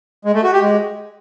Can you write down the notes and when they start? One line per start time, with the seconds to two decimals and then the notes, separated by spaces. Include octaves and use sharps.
0.25 G#3
0.34 A3
0.43 F#4
0.53 G4
0.62 G#3